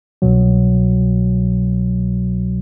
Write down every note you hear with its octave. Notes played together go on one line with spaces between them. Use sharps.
C2 B2 F#3